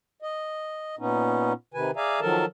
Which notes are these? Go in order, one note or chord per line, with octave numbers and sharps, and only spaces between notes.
D#5
A#2 B3 C#4 D#4
C3 D#3 B4 G#5
G#4 D5 E5 F5 G#5 A#5
D#3 F3 F#3 A4 A#4 A5